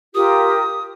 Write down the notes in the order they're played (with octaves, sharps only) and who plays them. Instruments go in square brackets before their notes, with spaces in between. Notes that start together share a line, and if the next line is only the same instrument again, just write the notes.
[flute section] F4 G4 A#4 [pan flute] D#6